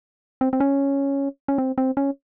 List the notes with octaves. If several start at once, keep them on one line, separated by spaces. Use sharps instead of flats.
C4
C4
C#4
C#4
C4
C4
C#4